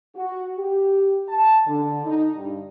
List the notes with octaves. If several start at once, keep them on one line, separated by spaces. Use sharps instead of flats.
F#4
G4
A5
D3
D#4
G2